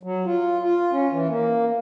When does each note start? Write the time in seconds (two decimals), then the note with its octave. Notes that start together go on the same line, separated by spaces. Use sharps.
0.03 F#3
0.25 F4
0.62 F4
0.92 C#4
1.12 E3
1.29 A#3